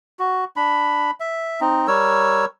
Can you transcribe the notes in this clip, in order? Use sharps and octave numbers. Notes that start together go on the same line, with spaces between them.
F#4
D4 B5
E5
C4 D#4
G3 A#4 C#5 E6